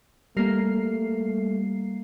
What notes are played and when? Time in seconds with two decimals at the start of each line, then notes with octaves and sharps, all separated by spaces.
0.37 G3 A3 A#3 A#4 C7